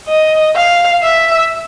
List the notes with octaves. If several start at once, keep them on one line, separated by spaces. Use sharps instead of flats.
D#5
F5
E5